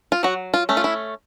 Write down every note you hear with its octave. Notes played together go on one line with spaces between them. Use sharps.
F4
F#3 F#4
F4
A3 C#4
F4
E4